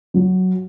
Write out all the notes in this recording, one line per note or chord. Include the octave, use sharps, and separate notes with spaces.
F#3